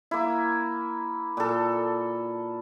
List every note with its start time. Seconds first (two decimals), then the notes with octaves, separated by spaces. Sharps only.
0.11 A#3 E4
1.37 A#2 A4